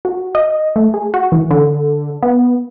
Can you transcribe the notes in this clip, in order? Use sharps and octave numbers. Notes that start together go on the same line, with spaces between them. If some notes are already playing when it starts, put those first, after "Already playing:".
F#4
D#5
A3
G#4
F#4
E3
D3
B3